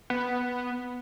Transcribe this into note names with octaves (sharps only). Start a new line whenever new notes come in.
B3